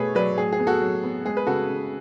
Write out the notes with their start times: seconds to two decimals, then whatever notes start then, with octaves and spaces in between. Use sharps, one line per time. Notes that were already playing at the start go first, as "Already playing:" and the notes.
Already playing: B2 A3 G#4 A4 B4 C#5
0.15 F#3 B4 D5
0.37 A2 G#4
0.53 G#4
0.59 B3
0.67 F#4 A4
0.81 F#3
1.03 B3
1.25 G#3 G#4
1.37 B4
1.47 C#3 F#4 A4
1.69 C#3